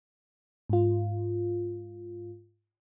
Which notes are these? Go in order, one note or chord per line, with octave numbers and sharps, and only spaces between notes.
G#2 F4